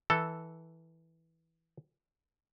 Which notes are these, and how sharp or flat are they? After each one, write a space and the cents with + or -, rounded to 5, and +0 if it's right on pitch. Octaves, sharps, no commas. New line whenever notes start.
E3 -10 A4 +0